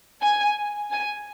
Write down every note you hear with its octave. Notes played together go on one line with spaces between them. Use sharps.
G#5
G#5